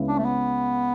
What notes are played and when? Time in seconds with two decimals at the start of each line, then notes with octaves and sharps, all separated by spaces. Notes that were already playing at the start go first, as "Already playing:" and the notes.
Already playing: C#2 C#3 G#3 B3 E4
0.08 D4
0.18 A3
0.25 B3